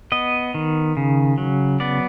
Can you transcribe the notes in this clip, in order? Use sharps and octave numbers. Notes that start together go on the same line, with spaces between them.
B3 D#5
D#3
C#3
F#3
B3 D5